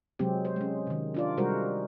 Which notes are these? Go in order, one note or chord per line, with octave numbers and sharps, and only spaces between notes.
C3 F#3 G#3 C4 G4
C5
G#3 C#4
C3 D#3
D4 F4 D5
C3 G3 G#3 F#4 A#4 C5